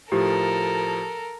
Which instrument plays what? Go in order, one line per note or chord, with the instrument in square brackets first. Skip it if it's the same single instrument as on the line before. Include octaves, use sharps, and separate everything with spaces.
[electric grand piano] A2 F3 [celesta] G4 [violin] A4 A#4